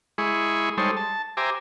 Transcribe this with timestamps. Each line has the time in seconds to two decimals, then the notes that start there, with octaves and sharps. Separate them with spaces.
0.18 G#3 E4 G#4 B5 C#6
0.78 G3 G#3 D#4 A4 C5 C#5
0.97 A5
1.37 G4 C5 E5 G#5 A#5 D6